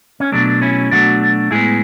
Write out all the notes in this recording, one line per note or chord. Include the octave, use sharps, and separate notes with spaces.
C#4
B2 F#3 A3 D4
C#4 E4
B2 F#3 A3 D4 F#4
A2 G#3 B3 E4 G#4